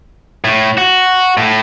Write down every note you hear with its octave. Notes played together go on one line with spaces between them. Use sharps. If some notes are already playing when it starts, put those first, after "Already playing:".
A2
F#4
A2